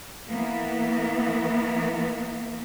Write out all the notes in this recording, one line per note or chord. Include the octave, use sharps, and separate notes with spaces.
E3 A#3 B3